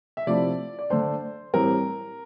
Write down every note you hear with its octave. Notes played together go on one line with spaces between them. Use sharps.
E5
C3 F3 A3 E4 D5
D5
D3 A3 D4 C5
A2 E3 G3 C4 A#4